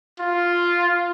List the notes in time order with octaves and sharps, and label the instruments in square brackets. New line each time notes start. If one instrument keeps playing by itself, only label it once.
[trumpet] F4